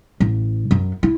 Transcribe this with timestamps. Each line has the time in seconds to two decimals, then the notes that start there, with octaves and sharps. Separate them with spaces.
0.20 A1
0.71 F#2
1.03 E4